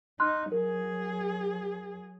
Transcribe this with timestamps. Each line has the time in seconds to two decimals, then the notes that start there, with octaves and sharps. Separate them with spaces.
0.20 D#4 C6 F6 F#6
0.52 F#3 G#4 A#4